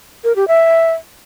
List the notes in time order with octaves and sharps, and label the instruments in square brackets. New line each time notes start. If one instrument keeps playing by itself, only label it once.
[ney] A#4
G4
E5